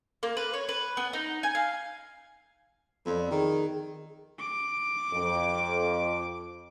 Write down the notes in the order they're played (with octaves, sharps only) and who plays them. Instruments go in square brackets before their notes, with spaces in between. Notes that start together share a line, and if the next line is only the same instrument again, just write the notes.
[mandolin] A#3
B4
C#5
B4
B3
D#4
G#5
F5
[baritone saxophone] F2 [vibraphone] B3 D5
[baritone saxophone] D#3 [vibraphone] G#4
[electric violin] D6
[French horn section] F2